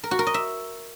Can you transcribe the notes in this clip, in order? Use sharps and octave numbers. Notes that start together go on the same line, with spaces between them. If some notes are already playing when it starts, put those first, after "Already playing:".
A#4
F#4
A#4
D#5
E5